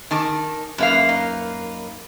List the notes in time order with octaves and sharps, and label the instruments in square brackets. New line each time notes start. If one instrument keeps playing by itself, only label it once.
[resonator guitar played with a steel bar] D#3 [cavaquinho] G#5 A5 D6
[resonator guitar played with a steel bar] F#2 A#3 F5 [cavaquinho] B4 E5 B5
[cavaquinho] D#4 B4